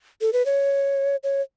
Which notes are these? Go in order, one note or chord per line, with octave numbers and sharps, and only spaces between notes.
A4
B4
C#5
C#5